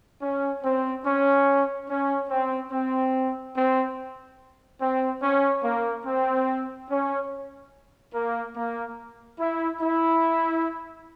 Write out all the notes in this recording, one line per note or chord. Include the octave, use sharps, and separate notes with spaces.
C#4
C4
C#4
C#4
C4
C4
C4
C4
C#4
A#3
C4
C#4
A#3
A#3
E4
E4